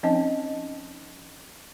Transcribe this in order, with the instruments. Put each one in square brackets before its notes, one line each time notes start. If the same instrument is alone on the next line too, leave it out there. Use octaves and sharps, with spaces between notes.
[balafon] F3 C4 C#4 D#4 D#5 A5